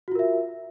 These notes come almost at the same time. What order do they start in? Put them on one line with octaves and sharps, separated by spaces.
F#4 F4 A#4 E5